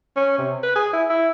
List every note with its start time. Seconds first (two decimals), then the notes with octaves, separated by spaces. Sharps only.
0.16 C#4
0.38 C3
0.63 B4
0.76 G#4
0.93 E4
1.09 E4